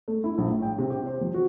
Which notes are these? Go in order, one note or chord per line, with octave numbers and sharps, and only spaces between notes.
A3
E4
A#1
A2
G5
C3
G4
C5
F3
F#4